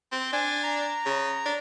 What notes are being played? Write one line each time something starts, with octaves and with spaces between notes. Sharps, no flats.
C4
D4 G#5
A#5
C#3
D4